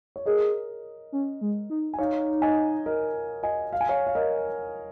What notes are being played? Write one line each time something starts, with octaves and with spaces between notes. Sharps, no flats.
C#5
G#4 A#4 D#5
C#4
G#3
D#4
G#5
D#4 C#5 F5
D#5 G#5
A#4 D#5
D#5 G#5
F5
G#5
C#5 F5
F5
A#4 D#5